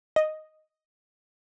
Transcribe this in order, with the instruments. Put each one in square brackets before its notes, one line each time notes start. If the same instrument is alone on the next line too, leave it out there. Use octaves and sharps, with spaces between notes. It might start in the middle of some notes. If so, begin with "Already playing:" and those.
[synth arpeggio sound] D#5